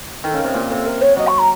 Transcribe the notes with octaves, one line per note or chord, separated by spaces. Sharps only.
D#3 A4
C#3 A#4
C3
A#2 A#4
C3 A4
A#4
C#5
F#3 D#5
C#6
A#5